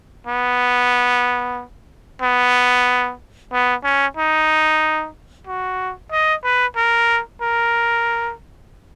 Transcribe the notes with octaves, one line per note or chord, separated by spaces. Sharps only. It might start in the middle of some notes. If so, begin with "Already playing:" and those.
B3
B3
B3
C#4
D#4
F#4
D#5
B4
A#4
A#4